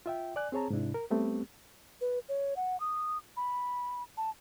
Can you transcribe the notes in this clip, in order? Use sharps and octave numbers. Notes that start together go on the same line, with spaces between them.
F4 E5 G5
D5 G#5 F#6
C4 G#4 C#5 A5 A#5
G#2 C3 D4 E4
A#4
G3 A3 B3 C4 G4
B4
C#5
F#5
D#6
B5
A5